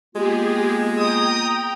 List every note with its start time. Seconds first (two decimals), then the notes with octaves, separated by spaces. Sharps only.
0.15 G#3 A#3 B3 F4 G4 G#4
0.98 G5 A#5 D#6